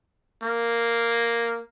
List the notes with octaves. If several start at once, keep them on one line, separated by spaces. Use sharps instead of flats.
A#3